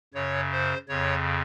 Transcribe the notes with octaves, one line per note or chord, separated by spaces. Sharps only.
F#2 C#3 C#5
C5
F2 C#3 C#5